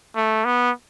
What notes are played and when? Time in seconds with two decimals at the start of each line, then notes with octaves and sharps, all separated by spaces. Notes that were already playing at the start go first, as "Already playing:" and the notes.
0.16 A3
0.45 B3